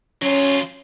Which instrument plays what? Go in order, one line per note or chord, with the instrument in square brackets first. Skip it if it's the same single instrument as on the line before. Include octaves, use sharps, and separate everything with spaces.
[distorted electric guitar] F#3 F4 [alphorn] C#4